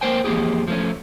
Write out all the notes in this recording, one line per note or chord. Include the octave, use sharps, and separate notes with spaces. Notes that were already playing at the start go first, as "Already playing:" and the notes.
A#3 A#4 C5 G5 G#5
E2 F3 A#3 E4 G4 G#4
F3 A3 C#4